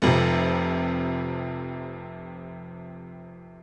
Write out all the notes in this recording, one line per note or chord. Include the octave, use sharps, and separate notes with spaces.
F1 F2 C3